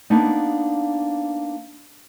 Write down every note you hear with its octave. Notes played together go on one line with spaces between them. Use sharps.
A#3 B3 D4 D#4